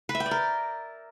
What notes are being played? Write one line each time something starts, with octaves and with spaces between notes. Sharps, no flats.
B4
E5
G5
D5
A#4